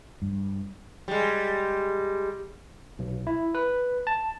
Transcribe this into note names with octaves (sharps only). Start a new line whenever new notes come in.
G2
G3 G#3
B1
E4
B4
A5